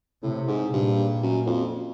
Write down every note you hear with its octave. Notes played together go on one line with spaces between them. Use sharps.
A2 C3
G#2
G2 A#2
F#2
F2